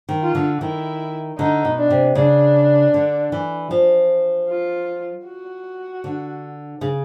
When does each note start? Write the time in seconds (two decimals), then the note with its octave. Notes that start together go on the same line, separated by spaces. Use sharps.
0.09 D#3
0.22 F4
0.35 D3
0.60 D#3 E4
1.38 D3 D#4
1.65 B2
1.78 D4
1.90 C3
2.15 C#3 D4
2.94 D3
3.32 E3
3.71 F3
4.49 F4
5.26 F#4
6.04 D3
6.81 C#3